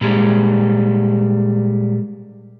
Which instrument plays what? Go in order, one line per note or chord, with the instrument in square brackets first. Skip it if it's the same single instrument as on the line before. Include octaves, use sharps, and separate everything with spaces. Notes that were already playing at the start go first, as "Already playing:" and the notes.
[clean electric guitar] A#2 G3 G#3